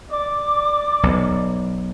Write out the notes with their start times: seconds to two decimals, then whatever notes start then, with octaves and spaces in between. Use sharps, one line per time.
0.10 D5 D6
1.03 B1